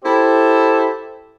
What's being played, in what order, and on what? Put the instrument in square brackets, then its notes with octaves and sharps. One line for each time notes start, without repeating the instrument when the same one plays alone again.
[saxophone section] E4 G4 A4 C5